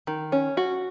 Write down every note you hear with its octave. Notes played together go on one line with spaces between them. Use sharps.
D#3
C#4
F#4